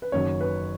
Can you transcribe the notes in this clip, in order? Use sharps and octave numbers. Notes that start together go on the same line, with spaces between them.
B4
F#1 F#2 D#3 F#3 C#5
B4